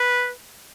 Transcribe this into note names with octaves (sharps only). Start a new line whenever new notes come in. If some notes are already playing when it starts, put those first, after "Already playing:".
Already playing: B4